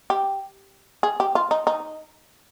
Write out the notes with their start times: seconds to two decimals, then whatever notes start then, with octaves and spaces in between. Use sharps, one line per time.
0.10 G4
1.03 G#4
1.20 G4
1.35 F4
1.51 D#4
1.67 D#4